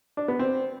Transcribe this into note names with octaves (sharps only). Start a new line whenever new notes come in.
D4
B3
C4